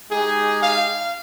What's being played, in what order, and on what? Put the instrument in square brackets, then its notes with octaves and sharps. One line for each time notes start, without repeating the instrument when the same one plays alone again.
[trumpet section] G#3 D#4 G4 G#4
F5